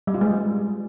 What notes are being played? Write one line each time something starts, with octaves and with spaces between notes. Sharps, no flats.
G3
F4
G#3